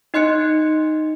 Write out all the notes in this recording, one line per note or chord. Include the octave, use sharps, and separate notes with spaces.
D#4 D#5 C6 F#6 C#7